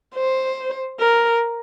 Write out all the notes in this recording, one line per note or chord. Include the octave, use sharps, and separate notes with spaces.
C5
A#4